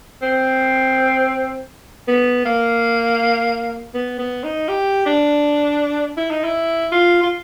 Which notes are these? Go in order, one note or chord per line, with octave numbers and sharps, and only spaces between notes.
C4
B3
A#3
B3
B3
D#4
G4
D4
E4
D#4
E4
F4
F4